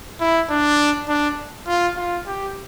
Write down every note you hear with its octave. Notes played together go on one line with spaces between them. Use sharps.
E4
D4
D4
F4
F4
G4